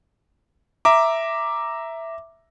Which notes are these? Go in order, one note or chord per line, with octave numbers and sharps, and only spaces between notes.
E5 A#5 D6